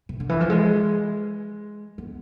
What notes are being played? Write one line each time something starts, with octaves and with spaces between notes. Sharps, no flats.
C3
D3
E3
F3
G#3
B3